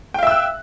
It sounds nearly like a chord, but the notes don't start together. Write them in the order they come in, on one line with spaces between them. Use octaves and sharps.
G5 F5 E5 E6 F#6